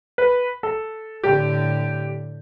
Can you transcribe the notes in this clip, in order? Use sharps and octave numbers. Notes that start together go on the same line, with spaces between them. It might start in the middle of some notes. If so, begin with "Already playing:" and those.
B4
A4
A2 D3 G4